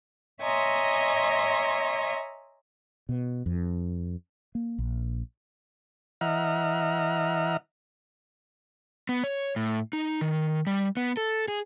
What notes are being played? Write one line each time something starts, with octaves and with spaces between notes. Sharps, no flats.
C#5 D#5 E5 G#5 A#5 C6
B2
F2
A#3
A#1
E3 D#5 E5 F#5 A#5 F6
B3
C#5
A2
D#4
D#3
G3
B3
A4
G#4